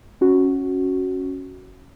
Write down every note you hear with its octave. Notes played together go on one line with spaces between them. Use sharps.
C#4 F#4